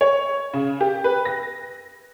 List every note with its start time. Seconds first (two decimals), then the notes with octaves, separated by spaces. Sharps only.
0.01 C#5
0.54 C#3
0.81 G4
1.04 B4
1.25 A#6